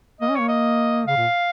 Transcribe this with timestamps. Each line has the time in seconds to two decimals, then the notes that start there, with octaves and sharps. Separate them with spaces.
0.21 A#3 D#5
0.30 C#4 C#5
0.40 A#3
0.49 D#5
1.07 C#3 F5
1.17 A#2